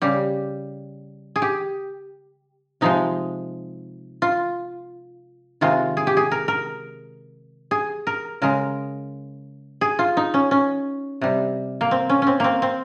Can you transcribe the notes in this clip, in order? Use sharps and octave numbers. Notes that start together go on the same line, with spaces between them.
C#3 G3 G4
G#4
G4
C3 F3 G#3 D#4
F4
C3 D#3 G#3 F4
G#4
G4
G#4
A#4
A#4
G#4
A#4
C#3 G#3 A#4
G#4
F4
D#4
C#4
C#4
C3 G3
A#3
C4
C#4
C4 C#4
A#3 C4
C4